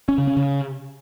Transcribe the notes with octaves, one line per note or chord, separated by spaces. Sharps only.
C#4
C#3
C#4
C#3